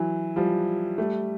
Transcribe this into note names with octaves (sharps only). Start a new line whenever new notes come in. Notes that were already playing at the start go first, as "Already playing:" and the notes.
Already playing: E3 F#3
F3 G3
G3 A3